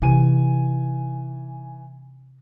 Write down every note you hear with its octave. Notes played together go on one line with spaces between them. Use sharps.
C3 E3 D#4 G#5 D#7